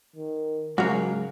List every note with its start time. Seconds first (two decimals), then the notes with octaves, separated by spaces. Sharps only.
0.16 D#3
0.78 G#2 C#3 F#3 G#3 F#4 A#4